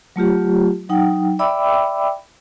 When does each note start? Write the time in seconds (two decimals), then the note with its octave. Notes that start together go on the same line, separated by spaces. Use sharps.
0.16 F#3 A3 F4 G4
0.89 F#3 D#4 F#5 G5
1.39 D5 E5 G5 B5 D6 E6